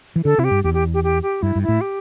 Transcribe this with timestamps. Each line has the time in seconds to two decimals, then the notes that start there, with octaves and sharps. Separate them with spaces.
0.16 E3
0.24 D3 A4
0.38 C3 E4
0.44 G4
0.51 G2
0.64 E2 G4
0.74 G4
0.94 G4
1.04 G4
1.22 G4
1.42 G2 E4
1.56 G2
1.62 E4
1.68 A2
1.81 G4